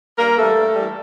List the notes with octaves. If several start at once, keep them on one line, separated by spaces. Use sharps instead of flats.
G2 A#3 A#4
E3 G3 A3 A4
G2
E3 G3